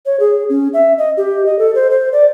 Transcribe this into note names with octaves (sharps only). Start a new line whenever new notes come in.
C#5
G#4
C#4
E5
D#5
G4
D#5
A4
C5
C5
D5